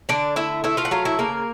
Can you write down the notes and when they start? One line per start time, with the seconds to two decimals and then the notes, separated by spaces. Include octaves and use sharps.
0.09 D3 D4 D5
0.36 A3 E4 E5
0.64 A3 E4 E5
0.77 F4 F5
0.85 F#5
0.91 F#3 F4 F5
1.05 E4 E5
1.19 C#3 A#3 A#4